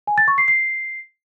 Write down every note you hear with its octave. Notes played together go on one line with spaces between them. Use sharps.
G#5
A6
C#6
C7
C7